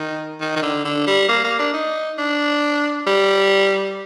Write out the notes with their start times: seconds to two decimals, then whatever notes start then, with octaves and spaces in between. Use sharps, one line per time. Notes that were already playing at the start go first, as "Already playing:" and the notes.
Already playing: D#3
0.40 D#3
0.56 D#3
0.62 D3
0.85 D3
1.07 G3
1.29 A#3
1.44 A#3
1.59 D4
1.73 D#4
2.18 D4
3.07 G3